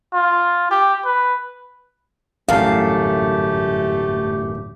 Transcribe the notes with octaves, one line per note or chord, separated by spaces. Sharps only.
F4
G4
B4
D1 G1 F#2 E3 A3 G4 A4 F5